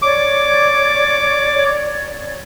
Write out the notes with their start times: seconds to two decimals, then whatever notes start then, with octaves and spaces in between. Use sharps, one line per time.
0.02 C#5 D5 D6